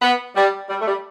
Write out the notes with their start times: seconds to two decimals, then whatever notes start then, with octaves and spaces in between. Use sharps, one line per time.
0.01 B3
0.35 G3
0.70 G3
0.81 A3
0.87 G3